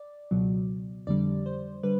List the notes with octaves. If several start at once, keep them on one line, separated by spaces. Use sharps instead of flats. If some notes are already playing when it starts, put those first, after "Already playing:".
Already playing: D5
C#2 B2 F#3
F2 D3 G3 D5
C5
D3 G3 B4